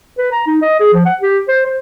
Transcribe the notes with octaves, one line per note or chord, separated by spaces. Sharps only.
B4
A#5
D#4
D#5
G#4
F3
F#5
G4
C5
C5